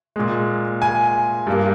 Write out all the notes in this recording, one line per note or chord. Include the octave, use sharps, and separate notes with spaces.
A#2 G#3
G#5
G2 G3 A#3